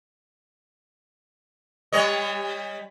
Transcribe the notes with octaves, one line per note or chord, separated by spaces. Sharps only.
G3 C#5 D#5